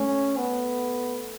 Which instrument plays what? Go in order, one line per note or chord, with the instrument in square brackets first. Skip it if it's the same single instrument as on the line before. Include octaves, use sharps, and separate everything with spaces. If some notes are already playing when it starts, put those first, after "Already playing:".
Already playing: [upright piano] A3 A4 [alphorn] C#4
[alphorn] B3